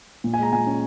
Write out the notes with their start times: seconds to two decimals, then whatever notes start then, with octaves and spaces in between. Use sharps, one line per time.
0.24 A#2
0.34 G#5
0.39 G#3 A#5
0.53 A#2 G#5
0.67 C#4